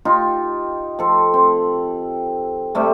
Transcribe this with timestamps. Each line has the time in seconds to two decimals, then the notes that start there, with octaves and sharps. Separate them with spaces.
0.05 D#4 F4 G4
0.99 F3 A4
1.34 C4
2.75 C3 G3 A3